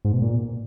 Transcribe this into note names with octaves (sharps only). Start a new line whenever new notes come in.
G#2
B2
A#2